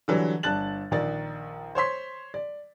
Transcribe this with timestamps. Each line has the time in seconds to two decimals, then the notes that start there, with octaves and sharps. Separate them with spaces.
0.08 D3 E3 F#3 G3
0.43 G1 D4 A5 F#6 A6 F#7
0.91 A#1 D#3 D5 A6
1.75 C5 C#5 C6 B6
2.34 D5